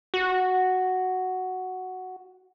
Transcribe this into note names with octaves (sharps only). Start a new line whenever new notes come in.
F#4